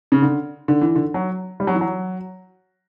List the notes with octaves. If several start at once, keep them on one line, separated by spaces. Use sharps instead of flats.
C#3
D3
D3
E3
D3
F#3
G3
F#3
E3
F#3